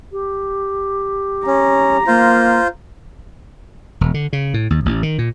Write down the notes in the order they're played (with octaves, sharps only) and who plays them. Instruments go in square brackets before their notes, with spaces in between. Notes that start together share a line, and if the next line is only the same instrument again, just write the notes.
[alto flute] G4
[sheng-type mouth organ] C#4 [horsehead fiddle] A#5
[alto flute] A#3 [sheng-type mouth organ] F4 C5
[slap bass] E1
D3
C#3
A2
D#2
A1
D#3
A#2